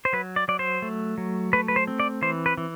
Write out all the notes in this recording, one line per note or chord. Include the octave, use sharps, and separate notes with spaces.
C5
F#3 B4
D5
F#3 D5
C5
A3
F#3
A3 B4
B4
C5
C4
D5
E3 C5
B4
E3